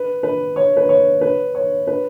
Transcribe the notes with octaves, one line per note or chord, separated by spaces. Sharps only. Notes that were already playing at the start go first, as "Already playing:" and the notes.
Already playing: B4
B4
C#5
B4
C#5
B4
C#5
B4